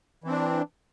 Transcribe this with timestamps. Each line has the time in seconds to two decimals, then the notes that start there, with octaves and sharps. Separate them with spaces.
0.24 E3
0.27 C4
0.31 D4